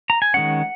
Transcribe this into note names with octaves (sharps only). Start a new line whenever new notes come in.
A#5
G#5
D#3 G#3 C#4 F#5